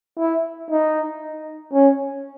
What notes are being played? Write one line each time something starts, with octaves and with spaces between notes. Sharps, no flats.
E4
D#4
C#4